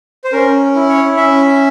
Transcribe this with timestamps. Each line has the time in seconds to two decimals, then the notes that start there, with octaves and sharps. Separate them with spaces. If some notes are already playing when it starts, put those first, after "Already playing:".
0.24 C5
0.32 C#4 A#4
0.75 E4
0.89 C#5
1.17 C#4 E5